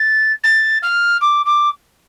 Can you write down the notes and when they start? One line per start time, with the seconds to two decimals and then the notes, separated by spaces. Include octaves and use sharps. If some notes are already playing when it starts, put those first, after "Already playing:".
Already playing: A6
0.44 A6
0.83 F6
1.21 D6
1.46 D6